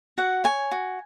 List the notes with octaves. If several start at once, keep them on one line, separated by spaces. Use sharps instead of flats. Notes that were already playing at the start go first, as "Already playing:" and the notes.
F#4 F#5
C#5 G#5
F#4